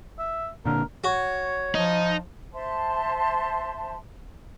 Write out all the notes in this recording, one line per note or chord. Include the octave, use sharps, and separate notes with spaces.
E5
A#2 D3 A#4
F#4 C#5
F3 D#4
C5 E5 A5 C6